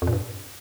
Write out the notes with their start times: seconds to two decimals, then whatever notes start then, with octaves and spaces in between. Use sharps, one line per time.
0.02 F2
0.07 A#2
0.13 G2